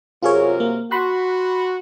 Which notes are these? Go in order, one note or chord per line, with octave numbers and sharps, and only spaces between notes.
F#2 C3 F4 G#4 A#4 C#5
A#3
F#4 B5 C6 F#6